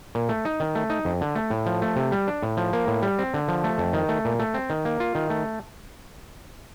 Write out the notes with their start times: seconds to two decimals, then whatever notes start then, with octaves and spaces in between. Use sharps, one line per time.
0.15 A#2
0.29 A3
0.45 D#4
0.60 D#3
0.75 A3
0.90 D#4
1.05 F2
1.21 D3
1.35 A3
1.50 A2
1.66 F3
1.82 A3
1.96 C3
2.12 G3
2.28 D4
2.43 A2
2.57 F3
2.73 A#3
2.87 A2
3.02 G3
3.19 C4
3.34 D3
3.48 F3
3.64 A3
3.78 F2
3.93 D#3
4.09 A3
4.25 A#2
4.39 A3
4.54 C4
4.70 D#3
4.85 A#3
5.00 F4
5.15 D#3
5.30 A3